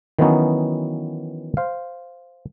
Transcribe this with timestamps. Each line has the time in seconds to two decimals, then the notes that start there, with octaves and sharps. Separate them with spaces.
0.19 D#3 E3 F#3 B3 C#4 D#4
1.57 C5 F5